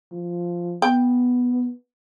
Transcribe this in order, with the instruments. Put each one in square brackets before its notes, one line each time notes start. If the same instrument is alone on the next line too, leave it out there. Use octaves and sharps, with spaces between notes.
[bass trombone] F3
[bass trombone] B3 [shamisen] G5